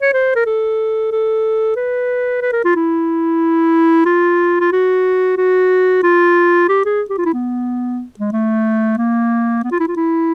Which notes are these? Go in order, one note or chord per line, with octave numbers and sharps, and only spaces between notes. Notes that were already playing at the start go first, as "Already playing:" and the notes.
C#5
C5
A#4
A4
A4
B4
B4
A#4
F4
E4
F4
F4
F#4
F#4
F4
G4
G#4
G4
F4
E4
B3
G#3
A3
A#3
B3
F4
E4
F4
E4